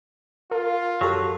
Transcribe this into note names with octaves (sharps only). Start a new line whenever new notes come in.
F4 A#4
F#2 F#3 G4 A4